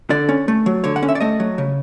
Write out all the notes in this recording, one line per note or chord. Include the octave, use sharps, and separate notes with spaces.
D3 D5
C#4
A3
F#3
D3 C#5
F#5
C#4
E5
D5
A3 D#5
F#3
C#3